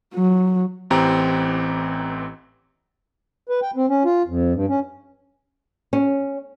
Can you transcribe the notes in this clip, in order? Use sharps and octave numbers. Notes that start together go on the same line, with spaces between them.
F#3
A1 E3 C4 G4 A#5
B4
G5
C4
C#4
F4
F2
G2
C#4
C#4